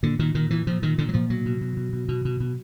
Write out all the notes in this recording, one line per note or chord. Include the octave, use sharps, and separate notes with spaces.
A#2 D3
A#2 D#3
A#2 D#3
A#2 E3
A#2 F3
A#2 D#3
A#2 D3
F#3
A#2 F3
B2 F#3
B2
B2
B2
B2
B2
B2
B2